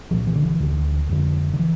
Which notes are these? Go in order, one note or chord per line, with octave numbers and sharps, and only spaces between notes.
C2 A#2 F3
E3
D3
E3
D2 D3
F2 D3
D3
E3